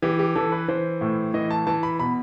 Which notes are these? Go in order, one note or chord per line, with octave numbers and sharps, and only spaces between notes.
E3 G4
G4
E3 A4
B4
E3 C5
A2
E3 D#5
A5
E3 A5
B5
B2 B5